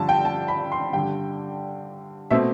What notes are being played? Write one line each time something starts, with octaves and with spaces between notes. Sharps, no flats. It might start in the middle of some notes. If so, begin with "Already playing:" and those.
Already playing: G2 D3 F3 A5
G5
A5
B5
C6
G2 D3 G3 G5
B2 A3 C4 E5